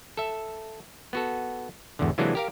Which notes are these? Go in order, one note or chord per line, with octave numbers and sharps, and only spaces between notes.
A4 E5
B3 F#4 A4
G#1 E2 D3
C3 E3 F#3 G#3 A#3 D4
G4 A#4 F5